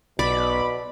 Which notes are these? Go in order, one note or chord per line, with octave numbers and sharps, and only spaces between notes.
B1 B2 D5 B5 D6